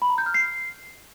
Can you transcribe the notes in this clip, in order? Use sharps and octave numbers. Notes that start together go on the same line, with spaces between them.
B5
A#5
G6
F6
C7